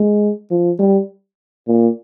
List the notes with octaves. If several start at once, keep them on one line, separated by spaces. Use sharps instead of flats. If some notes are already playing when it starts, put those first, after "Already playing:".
Already playing: G#3
F3
G3
A#2